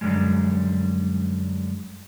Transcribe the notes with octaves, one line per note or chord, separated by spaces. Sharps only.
F#2 D3 D#3 G3 G#3